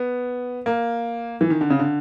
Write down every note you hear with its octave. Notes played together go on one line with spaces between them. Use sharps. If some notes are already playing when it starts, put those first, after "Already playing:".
Already playing: B3
A#3
E3
D#3
D3
C#3
D3